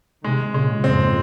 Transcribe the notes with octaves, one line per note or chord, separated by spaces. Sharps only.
C3 D#3 G#3
A#2 C#3 G#3
F2 G#2 C4